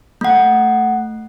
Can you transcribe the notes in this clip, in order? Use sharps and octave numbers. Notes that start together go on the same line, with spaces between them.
A3 F#5